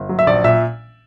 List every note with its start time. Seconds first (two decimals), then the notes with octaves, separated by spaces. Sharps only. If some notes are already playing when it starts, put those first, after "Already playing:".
Already playing: G1
0.09 F#3
0.19 E5
0.27 A#1 D5
0.44 A#2 E5